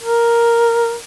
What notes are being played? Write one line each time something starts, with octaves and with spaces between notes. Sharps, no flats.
A#4